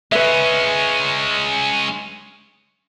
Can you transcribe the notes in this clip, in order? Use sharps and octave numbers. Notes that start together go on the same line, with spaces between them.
G#3 C#4 B4 E5